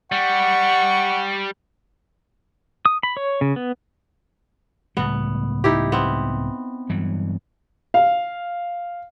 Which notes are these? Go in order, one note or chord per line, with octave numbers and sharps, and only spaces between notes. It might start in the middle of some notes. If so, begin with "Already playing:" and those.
G3 F#5 C#6
D#6
B5
C#5
C#3
B3
C#2 A2 G3 B3
D#4 E4 G4
B3 C4
G2 E3 F#3
F5